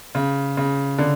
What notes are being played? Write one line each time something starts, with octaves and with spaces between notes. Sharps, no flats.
C#3
C#3
D3